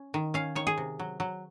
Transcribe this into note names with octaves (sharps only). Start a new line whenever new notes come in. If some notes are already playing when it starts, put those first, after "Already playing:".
Already playing: C#4
D#3
C#4 F5
D#3 C#5
G#4
C3
F#3
F#3